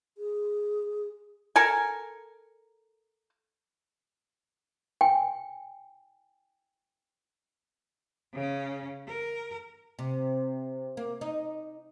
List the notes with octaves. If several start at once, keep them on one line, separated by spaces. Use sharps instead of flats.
G#4
A4 A#4 G#5
G5 G#5
C#3 C#4
A#4
C3
A#3
D#4